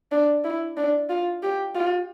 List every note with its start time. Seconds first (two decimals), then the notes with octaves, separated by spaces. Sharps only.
0.12 D4
0.45 E4
0.77 D4
1.10 F4
1.43 G4
1.75 F4